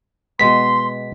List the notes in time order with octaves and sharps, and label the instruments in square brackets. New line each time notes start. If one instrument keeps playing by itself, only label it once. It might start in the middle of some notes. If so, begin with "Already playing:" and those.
[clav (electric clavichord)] B2 G#3 B3 [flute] C6 [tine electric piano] B6